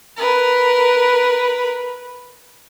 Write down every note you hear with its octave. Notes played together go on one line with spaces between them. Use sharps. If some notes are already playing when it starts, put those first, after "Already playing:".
A#4 B4